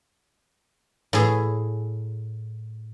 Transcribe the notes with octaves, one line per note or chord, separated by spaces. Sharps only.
A2 G#4